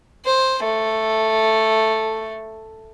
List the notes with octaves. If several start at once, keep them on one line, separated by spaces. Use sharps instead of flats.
C5
A3